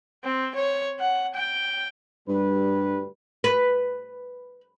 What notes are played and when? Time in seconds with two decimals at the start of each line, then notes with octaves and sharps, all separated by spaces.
0.24 C4
0.55 C#5
0.99 F#5
1.34 G5
2.28 D2 G2 G3 B4
3.44 B4